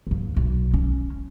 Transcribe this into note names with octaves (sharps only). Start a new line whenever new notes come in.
D#2 G#2
B1
C#4